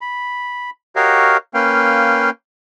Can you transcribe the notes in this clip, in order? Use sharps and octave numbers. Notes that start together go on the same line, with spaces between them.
B5
F#4 G4 A#4 C#5 D#5 F5
A#3 C#4 B4 F5 G5